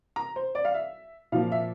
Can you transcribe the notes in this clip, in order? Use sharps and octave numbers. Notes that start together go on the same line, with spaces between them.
A#5
C5
D5
F5
E5
A#2 F3 A#3 F5
E5